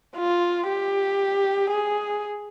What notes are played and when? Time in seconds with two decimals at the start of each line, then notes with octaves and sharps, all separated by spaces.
0.17 F4
0.68 G4
1.70 G#4